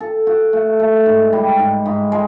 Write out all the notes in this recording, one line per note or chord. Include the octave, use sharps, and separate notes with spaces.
A4
F#4
A3
A3
G#2
G3
G#2
G#2
G#3